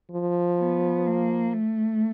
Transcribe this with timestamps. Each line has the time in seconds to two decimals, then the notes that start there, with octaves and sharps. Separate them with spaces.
0.11 F3
0.59 B3
1.06 A#3
1.53 A3